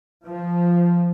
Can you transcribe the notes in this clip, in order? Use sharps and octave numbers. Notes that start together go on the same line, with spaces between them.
F3